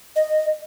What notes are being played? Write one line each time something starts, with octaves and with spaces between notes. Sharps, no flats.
D#5